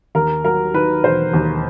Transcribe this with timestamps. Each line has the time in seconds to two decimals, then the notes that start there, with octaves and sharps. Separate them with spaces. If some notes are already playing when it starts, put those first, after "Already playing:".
0.15 D#2 A#4
0.44 F#3 A#4
0.74 D#3 B4
1.04 E1 C5
1.34 D#2